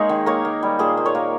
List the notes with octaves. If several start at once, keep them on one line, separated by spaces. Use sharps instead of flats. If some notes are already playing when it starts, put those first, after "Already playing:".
Already playing: G#3 A#3 D#4 G#4 A#4 C#5
D#3
A#3 A#4 C#5
A#3
G3
A#2 G#4 C5
A#3
A#4 C#5
A#3